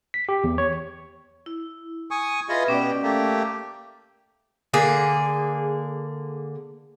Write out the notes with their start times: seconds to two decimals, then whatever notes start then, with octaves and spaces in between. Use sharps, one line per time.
0.14 B6
0.29 G4
0.44 E2
0.58 C#5
1.46 E4
2.11 G#5 C#6 D#6
2.49 F4 G#4 B4 D#5 E5 B5
2.68 B2 C#4 G4 D5
3.03 A3 A#3 G4
4.73 D3 A#3 G#4